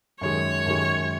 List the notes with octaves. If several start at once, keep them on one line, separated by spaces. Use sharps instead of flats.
F#2 D#3 G#3 C#5
F#2 D#3 G#3